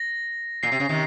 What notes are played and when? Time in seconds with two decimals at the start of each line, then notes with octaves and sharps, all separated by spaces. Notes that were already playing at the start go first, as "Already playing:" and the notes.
Already playing: A#6
0.63 A#2 C7
0.72 C3
0.80 C#3
0.89 C3 D#3